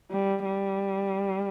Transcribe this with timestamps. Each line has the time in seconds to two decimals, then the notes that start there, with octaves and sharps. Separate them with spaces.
0.11 G3
0.45 G3